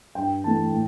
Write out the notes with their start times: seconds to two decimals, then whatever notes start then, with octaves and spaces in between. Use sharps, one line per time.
0.15 G2 G5
0.44 E3 A3 A5
0.72 A2